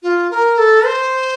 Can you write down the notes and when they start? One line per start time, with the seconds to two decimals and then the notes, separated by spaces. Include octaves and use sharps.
0.03 F4
0.31 A#4
0.58 A4
0.85 C5